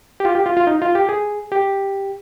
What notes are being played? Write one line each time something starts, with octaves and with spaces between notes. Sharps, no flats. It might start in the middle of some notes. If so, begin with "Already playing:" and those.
G4
F4
G4
F4
F4
D#4
F4
G4
G#4
G4